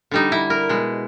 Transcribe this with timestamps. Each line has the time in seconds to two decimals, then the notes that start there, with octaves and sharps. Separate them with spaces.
0.11 D3 G3 D#4
0.32 E4
0.50 A#4
0.69 B2 G#3